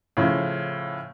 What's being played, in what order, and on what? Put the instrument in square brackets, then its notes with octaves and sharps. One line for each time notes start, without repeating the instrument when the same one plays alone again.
[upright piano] A2 C#3 F3